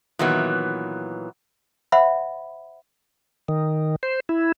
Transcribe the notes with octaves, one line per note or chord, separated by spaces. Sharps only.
A#2 D#3 E3 F#3 B3
C5 E5 F#5 B5
D#3
C5
E4